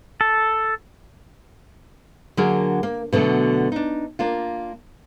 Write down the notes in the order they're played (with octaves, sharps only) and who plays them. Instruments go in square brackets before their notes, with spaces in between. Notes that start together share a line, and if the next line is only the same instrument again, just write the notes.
[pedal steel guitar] A4
[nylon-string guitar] D3 F#3 A#3 D4 G#4 A#4
A#3
B2 D3 F#3 A3
D4 D#4
A#3 D4 F4